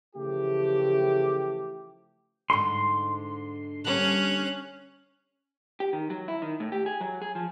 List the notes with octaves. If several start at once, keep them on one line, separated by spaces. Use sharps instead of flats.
C#3 E3 F3 A3 G4
G#2 D3 C6
D3 G3 A#3 C#4 F#6
G4
D#3
F#3
E4
D#3
A2
G4
G#4
F#3
G#4
F3